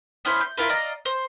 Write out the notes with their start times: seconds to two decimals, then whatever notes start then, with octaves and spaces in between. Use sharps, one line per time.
0.25 B3 C#4 E4 C5
0.41 G6
0.57 E4 F4 A#4 B4
0.69 D5 D#5 F5 A#5
1.05 C5